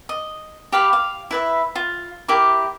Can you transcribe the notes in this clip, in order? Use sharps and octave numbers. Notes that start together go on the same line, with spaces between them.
D#5
G4 F5 B5
F5
E4 B4 E5
F4
E4 G4 A#4 D6